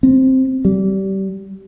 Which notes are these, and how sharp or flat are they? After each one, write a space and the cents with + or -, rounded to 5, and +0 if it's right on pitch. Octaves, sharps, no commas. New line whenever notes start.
C4 +5
G3 -25